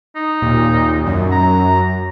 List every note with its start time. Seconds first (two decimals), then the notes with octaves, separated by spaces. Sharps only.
0.16 D#4
0.42 D#2 A#2
1.07 F#2
1.31 A#5